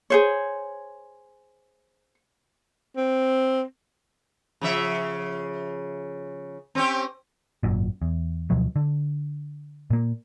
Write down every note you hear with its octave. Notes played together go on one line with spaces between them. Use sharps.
G#4 C5 C#5
C4
C#3 F3 E5
C4 C#4 G4
G#1 F#2 A#2
E2
D2 B2 F3 F#3
D3
A#2 A#3